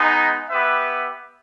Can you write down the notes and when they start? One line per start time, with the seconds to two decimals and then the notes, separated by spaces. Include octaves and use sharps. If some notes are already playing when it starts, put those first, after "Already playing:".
Already playing: G#3 B3 D#4
0.50 B3 G4 B4 E5